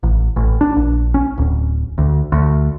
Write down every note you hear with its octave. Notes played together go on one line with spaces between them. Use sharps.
A1
A1
D4
A#1
C#4
D1
D2
D2